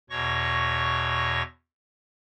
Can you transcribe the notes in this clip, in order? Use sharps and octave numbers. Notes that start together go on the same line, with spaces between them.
E2 B2 C#5 C#6 A#6